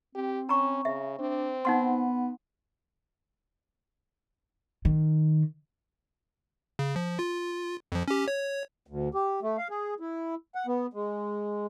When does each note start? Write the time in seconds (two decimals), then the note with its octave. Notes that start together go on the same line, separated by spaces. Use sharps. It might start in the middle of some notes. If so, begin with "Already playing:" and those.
0.15 C4 G4
0.49 C#4 A#5 B5 C#6
0.85 C#3 E5
1.19 C4 D4
1.65 B3 D#4 F#5 C6
4.85 D#3
6.79 C#3
6.96 F3
7.19 F4
7.92 F2 F3
8.08 C#4 G4
8.28 C#5
8.87 D2
9.14 G4
9.42 A3
9.57 F5
9.70 G#4
10.00 E4
10.55 F#5
10.67 B3
10.93 G#3